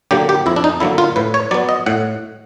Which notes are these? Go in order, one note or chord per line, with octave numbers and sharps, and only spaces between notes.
D3 F#3 A#3 G4
G4
F2 E4
D4
D#4
D3 F#3 A#3 E4
F4
A2 B4
C#5
F#3 B3 D5
D#5
A2 F#5